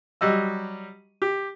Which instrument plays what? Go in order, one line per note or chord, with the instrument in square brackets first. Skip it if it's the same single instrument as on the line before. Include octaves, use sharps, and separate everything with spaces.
[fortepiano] F#3 G3 D#5 E6
G4